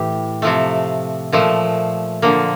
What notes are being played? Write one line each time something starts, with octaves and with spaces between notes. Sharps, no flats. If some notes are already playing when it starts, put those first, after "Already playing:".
Already playing: A2 E3 G4
C3 F3 A3
A#2 F3 A3
D3 F3 A#3